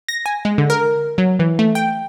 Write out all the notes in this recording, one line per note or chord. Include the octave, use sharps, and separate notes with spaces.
A#6
G#5
G#3
D3
A#4
F#3
E3
A3
G5